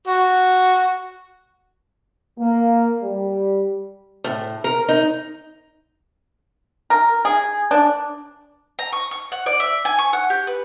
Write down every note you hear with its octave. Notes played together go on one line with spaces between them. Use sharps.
F#4
A#3
G3
A2
A#4
D#4
A#4
G#4
D4
A#5
C#6
C#6
F#5
D5
E5
G#5
C#6
F#5
G4
B4